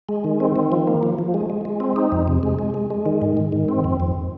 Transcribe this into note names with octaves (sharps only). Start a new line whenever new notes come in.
G#3
D#3
C4
D#3
F3
A#3
F3
F3
G#3
G#3
G#3
C4
D#4
F2
C3
G#3
G#3
G#3
G#3
D#3
G#2
G#2
D#3
C4
F2
F2